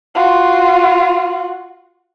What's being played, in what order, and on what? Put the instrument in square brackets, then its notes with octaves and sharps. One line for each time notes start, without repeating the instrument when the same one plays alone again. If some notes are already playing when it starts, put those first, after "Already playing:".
[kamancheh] F4 F#4